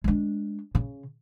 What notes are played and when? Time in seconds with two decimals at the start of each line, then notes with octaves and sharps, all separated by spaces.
0.04 G#3 D4
0.75 C#3